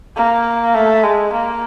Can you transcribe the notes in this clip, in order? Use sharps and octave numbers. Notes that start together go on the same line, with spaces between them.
A#3
A3
G#3
A#3